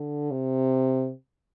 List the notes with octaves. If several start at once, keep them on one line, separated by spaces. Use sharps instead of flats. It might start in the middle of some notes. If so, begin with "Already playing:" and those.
Already playing: D3
C3